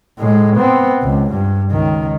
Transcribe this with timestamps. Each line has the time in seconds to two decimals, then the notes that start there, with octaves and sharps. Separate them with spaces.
0.19 A2 G#3
0.56 B3 C4
1.03 C#2
1.32 G2
1.71 C#2 D#3